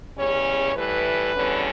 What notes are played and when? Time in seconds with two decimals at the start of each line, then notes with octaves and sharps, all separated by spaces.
0.16 E2 C#3 G3 C#4 C#5
0.76 A2 E3 G3 B4
1.36 E2 D3 G3 C#4